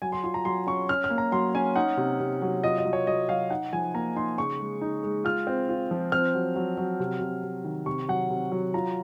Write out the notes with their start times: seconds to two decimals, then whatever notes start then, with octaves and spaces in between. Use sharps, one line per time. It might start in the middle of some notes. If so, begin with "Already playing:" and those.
0.02 F#3 G#5
0.12 C6
0.23 F4 C6
0.34 A#5
0.45 F#3 C6
0.67 C#4 C#6
0.89 C#4 F6
1.04 F6
1.10 A#3
1.18 A#5
1.32 F#3 C6
1.55 C#4 G#5
1.76 D#4 F#5
1.97 C3
2.20 C3
2.42 F#3
2.63 F4 D#5
2.78 D#5
2.85 F#3
2.93 C#5
3.07 F#3 D#5
3.29 F#3 F5
3.50 D#4 F#5
3.73 F3 G#5
3.94 A#3 A#5
4.16 D#4 C6
4.38 C#3 C#6
4.60 G#3
4.81 D#4
5.03 G#3
5.24 F4 F6
5.47 C4
5.69 F4
5.91 F3
6.12 C4 F6
6.34 F#3
6.56 F#3
6.77 F#3
7.00 C3
7.21 C3
7.43 C3
7.64 D#3
7.86 C3 C#6
8.08 F#3 F#5
8.30 C3
8.52 F#3
8.74 F4 A#5